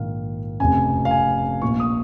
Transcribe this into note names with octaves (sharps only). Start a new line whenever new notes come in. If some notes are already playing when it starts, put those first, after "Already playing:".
Already playing: A#1 G#2 D#3 F5
F1 F2 C#3 G#5
F5
G#5
A#1 A#2 C#6
D#6